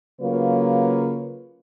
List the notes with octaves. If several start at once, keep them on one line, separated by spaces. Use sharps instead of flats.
C#3 F#3 A#3 F4 B4 C#5